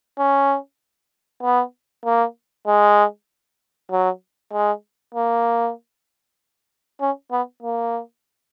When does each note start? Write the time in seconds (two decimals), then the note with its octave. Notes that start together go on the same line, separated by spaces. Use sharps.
0.19 C#4
1.43 B3
2.05 A#3
2.67 G#3
3.91 F#3
4.53 G#3
5.15 A#3
7.01 C#4
7.32 B3
7.63 A#3